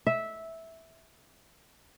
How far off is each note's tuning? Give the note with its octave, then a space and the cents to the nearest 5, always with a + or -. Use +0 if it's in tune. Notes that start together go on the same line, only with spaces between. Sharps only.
E5 -10